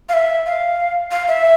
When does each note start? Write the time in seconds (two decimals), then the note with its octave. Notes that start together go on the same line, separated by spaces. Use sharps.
0.09 F5
0.14 E5
0.46 F5
1.11 F5
1.28 E5